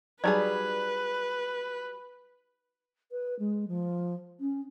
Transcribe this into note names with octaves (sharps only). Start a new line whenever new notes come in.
F#3 G3 D#4 G#4 B4 D5
B4
G#3
F3
C#4